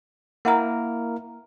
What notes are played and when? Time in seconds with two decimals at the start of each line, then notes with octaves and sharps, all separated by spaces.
0.45 A#3 E4 A#4 F#5 A#5